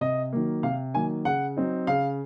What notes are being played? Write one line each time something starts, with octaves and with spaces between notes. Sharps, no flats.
C3 D#5
D#3 F#3 A#3
C3 F5
D#3 F#3 A#3 G#5
C#3 F#5
F#3 C4 D#4
C#3 F5